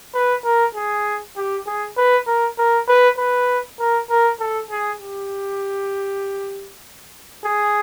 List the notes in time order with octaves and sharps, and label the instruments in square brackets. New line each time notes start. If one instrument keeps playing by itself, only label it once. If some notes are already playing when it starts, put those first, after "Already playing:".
[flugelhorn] B4
A#4
G#4
G4
G#4
B4
A#4
A#4
B4
B4
A#4
A#4
A4
G#4
G4
G#4